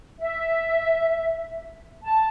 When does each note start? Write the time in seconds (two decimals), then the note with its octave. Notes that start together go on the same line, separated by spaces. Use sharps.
0.18 E5
2.03 A5